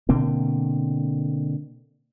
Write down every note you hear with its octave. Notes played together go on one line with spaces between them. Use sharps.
B2 D3 A#3 C4